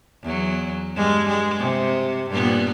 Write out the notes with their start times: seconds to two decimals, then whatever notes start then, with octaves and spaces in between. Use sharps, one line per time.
0.23 E2 F#3
0.96 G2 G3 G#3
1.28 G#3
1.59 C3
2.30 G2 A#2 B3